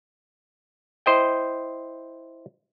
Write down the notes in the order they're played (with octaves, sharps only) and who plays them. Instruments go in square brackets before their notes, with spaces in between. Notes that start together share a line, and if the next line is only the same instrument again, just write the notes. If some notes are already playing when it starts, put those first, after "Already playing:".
[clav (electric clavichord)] E4 C5 D#5 G5